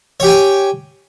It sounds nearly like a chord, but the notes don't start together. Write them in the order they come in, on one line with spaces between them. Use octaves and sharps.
C#5 G4 G#5 G5